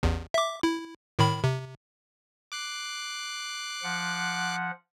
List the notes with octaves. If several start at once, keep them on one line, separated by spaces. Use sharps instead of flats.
A1 E2
E5 D6
E4
A2 D#3 B5
C3
D6 F#6 C7
F3 F#5